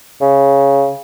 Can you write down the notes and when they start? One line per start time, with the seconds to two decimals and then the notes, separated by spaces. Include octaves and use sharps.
0.21 C#3